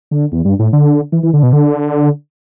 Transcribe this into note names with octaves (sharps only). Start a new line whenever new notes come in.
D3
E2
G2
A2
D3
E3
E3
D3
B2
D3